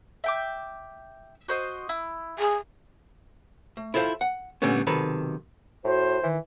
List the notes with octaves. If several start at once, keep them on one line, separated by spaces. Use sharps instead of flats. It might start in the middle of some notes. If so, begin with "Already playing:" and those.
E5 G5 D6
F#4 C5 D#5
E4
G#4
A3
E4 F4 A4 C5 D5 F5
F#5
A#2 D3 G3 A3 B3 C#4
B1 C3 D#3 A4 B4 A#5
A2 F#4 C5
D#3 E3